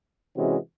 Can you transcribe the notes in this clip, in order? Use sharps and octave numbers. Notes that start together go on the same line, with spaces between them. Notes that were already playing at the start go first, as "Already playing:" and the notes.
C3 E3 G#3 C#4 F#4